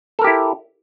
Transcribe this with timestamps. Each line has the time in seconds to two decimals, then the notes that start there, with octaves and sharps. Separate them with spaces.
0.19 A4
0.22 A#4
0.24 G4
0.27 E4